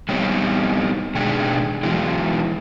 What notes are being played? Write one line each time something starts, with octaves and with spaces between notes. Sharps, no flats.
G3 B3 C4 D#4 G4 C#5
B2 D#3 G#3 D4 G4 G#4
E3 F#3 G#3 B3 D#4 E4